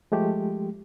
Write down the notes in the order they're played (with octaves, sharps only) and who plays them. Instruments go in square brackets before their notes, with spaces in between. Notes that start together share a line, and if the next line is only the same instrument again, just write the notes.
[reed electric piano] F3 G#3 A3 G4